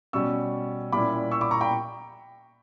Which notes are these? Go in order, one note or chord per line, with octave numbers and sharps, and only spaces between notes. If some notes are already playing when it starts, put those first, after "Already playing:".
B2 G3 C#4 C#6 E6
A#2 G3 C#4 E4 B5 D6
C#6 E6
B5 D6
A#5 C#6
G5 B5